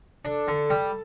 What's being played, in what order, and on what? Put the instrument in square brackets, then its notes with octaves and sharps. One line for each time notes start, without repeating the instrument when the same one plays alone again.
[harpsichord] D4 [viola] A4
[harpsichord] D3
[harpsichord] G3 [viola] A4